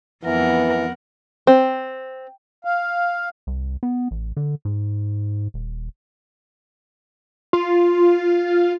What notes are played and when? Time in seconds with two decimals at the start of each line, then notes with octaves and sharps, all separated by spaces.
0.25 F2 E3 B3 A#4 F#5
1.47 C4
2.65 F5
3.47 C2
3.83 B3
4.11 A1
4.37 D3
4.65 G#2
5.54 D#1
7.53 F4